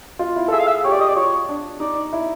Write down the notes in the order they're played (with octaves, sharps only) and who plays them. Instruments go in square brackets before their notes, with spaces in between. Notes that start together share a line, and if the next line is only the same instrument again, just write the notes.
[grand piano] F4
E4
A4
[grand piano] G#4 [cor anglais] E5
[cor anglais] F5
E5
[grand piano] G4 [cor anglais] C#5
[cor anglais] D5
D#5
D5
[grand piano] F4 [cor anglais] C#5
[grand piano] D4
[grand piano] D#4 [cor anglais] D5
[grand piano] E4